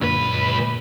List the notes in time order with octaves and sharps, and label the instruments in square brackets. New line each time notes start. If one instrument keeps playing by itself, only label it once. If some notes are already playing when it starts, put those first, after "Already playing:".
[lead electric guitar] C#2 B4 [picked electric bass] F#2 D3 D4 [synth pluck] A#2